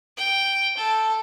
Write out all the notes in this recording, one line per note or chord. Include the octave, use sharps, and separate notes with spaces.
G5
A4